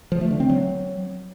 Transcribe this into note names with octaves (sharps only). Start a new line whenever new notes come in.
F3
A3
D3
C4
F#3